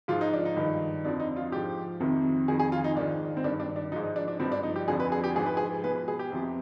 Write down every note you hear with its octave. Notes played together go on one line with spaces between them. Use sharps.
G#2 F3 F4
D#4
D4
D#4
G2 D#3
F2 D3 F3 D4
D#4
F4
G#2 F3 G4
F2 C3 D#3
F2 D#3 G#4
G#4
F4
D#4
G#2 D#3 D4
C4
G2 D#3 D4
D4
D4
G#2 F3 D#4
D#4
D4
D4
G2 F3 C4
D4
D#4
G4
F2 D3 F3 G#4
B4
G#4
G4
G#2 F3 G#4
B4
G#4
B2 B4
B4
G#4
G4
F2 C3 F3